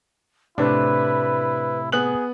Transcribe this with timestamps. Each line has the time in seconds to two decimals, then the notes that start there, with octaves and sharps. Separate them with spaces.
0.58 A2 C3 D4 E4 B4
1.92 B3 G#4 F#6 F#7